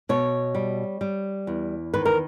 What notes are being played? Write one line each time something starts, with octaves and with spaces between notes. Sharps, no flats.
B2 C#5
G3
G3
E2
D#3 B4
A#4